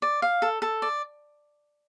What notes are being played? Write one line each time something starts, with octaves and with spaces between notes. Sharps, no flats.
D5
F5
A4
A4
D5